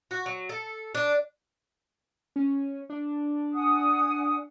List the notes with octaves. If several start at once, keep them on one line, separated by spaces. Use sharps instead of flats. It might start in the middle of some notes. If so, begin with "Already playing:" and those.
F#4
F#3
A4
D4
C#4
D4
F#5 G#5 D#6